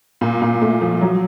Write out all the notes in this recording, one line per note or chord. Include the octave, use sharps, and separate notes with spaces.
A#2
A#2
A3
F3
F#3